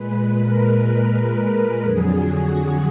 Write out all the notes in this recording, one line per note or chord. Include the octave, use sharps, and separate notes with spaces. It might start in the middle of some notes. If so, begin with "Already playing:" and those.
Already playing: A#2 G#3 B4
A#4
B4
A#4
F2 D3 F#3 G#4
F#4